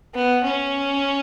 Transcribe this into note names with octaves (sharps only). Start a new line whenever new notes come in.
B3
C#4